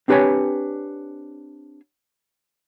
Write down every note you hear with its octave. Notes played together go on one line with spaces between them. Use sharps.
C4 D4 G4 B4 C#5 G#5